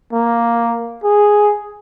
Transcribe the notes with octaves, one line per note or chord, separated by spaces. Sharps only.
A#3
G#4